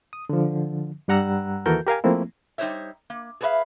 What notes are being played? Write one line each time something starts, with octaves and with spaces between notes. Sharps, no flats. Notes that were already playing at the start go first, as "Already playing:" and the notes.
D#6
D3 F3
G2 G3 F#5 A#5 E6 F#6
D#2 E3 F#4 A4 A#4 G6
G4 A#4 F5 G#5
F3 A3 A#3 C4 E4
G3 D#4 G4 C5 C#5 E5
A#3
G#4 A4 B4 C#5 E5 F5